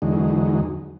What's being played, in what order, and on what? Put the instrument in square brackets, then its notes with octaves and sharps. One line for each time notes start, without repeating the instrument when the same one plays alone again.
[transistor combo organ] E2 D3 F#3 G#3 D#4